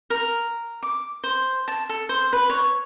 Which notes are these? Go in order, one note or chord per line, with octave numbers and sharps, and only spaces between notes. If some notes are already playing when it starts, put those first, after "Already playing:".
A#4
D6
C5
A5
A4
C5
B4
C#5